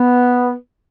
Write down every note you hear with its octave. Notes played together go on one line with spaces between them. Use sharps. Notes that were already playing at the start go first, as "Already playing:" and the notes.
Already playing: B3